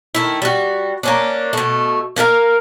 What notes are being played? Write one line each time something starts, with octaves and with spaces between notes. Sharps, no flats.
D#3 A3 E4
G3 F#4
A#3 C#4 D4
B2 A3
A#3 D4 A#4 F5